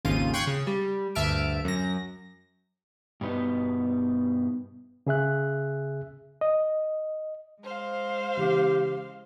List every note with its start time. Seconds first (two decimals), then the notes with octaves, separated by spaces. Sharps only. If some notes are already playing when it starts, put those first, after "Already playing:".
0.05 G#1 D#2 C#3 F4 D#7
0.34 G5 C6 C#6 F#6 G#6
0.47 C#3
0.67 G3
1.15 D2 G2 E5 A5 F6 D7
1.64 F#2 A#6
3.21 G2 B2 B3 D#4
5.07 C#3 G#4 E5 F#6
6.41 D#5
7.62 G#3 C5 F5
8.37 C#3 E3 G4